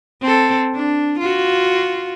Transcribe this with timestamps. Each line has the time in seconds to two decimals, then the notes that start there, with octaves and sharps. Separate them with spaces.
0.22 C4 A4
0.75 D4
1.19 F4 F#4